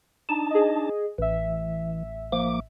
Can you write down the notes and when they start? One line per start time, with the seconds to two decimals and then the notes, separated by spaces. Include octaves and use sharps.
0.29 D4 D#4 A5
0.51 G#4 D#5
1.18 A1 E3 E5
2.32 F3 A#3 D6